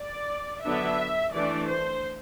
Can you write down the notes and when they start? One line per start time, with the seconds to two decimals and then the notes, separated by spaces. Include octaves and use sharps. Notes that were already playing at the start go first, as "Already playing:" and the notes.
Already playing: D5
0.63 D3 F#3 B3 D4 E5
1.33 E3 A3 D4 D5
1.69 C5